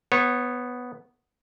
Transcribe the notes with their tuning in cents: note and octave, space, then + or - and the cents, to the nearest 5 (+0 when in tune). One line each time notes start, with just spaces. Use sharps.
B3 +0 C#5 -25